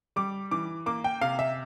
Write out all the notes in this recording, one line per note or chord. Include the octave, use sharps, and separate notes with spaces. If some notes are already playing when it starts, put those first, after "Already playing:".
G3 D6
E3 D6
A#3 D6
G5
C3 F5
E5